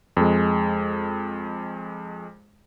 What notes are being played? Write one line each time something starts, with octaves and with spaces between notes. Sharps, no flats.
F2 G#3